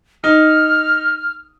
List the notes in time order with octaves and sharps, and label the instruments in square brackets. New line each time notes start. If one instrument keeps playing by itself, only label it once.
[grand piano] D#4 [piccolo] F6